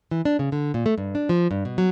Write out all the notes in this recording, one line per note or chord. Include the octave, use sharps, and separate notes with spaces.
E3
D4
C#3
D3
A#2
A3
G2
D4
F3
G2
B2
F#3